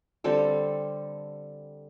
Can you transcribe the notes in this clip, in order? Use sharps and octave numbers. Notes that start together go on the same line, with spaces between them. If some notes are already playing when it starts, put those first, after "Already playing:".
D3 G3 C4 A4